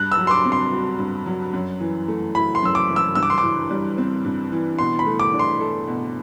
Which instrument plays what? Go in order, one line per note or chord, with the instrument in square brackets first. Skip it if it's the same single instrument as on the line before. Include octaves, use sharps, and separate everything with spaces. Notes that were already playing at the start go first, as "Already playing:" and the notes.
Already playing: [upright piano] G2 [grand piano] F#6
[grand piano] E6
[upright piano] F#3
[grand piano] C6
D6
[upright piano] C4
[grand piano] C6
[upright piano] F#4
G2
F#3
F#2
E3
A3
[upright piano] E4 [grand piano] B5
[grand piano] C6
[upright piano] F#2 [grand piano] E6
[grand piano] D6
[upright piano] E3
[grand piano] E6
[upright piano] G2 [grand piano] E6
[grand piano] D6
C6
[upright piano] E3 [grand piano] D6
[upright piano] G3
C4
G2
E3
[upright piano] B2 [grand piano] C6
[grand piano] B5
[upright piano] A3
[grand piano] D6
[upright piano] D4
[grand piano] C6
[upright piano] A4
B2